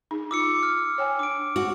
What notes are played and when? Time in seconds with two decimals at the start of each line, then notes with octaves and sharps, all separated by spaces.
0.11 D#4 G#4
0.31 D#4 F4 D6 E6 C#7
0.63 F6
0.98 C#5 G5 G#5
1.19 D4 D6 D7
1.56 F#4